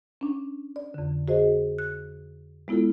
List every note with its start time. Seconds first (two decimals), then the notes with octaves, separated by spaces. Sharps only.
0.21 C#4 D4
0.76 D5
0.94 F2 D3
1.28 F#4 G#4 C5 D#5
1.79 F#6
2.68 G#3 B3 E4 F4 A4